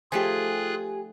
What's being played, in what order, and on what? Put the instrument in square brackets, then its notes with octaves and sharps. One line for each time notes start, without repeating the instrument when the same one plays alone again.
[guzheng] F3 A3 D#4 [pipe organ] F4 G#4 F#6 [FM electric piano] G4 G#5